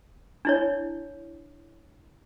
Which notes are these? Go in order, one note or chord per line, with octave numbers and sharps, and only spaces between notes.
D4 E4 C#5